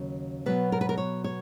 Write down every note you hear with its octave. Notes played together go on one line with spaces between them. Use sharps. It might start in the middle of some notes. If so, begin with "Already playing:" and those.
Already playing: D#2 C#3 F#3
B2 F#3 B3 B4
A#4
B4
A#4
C#5
C#5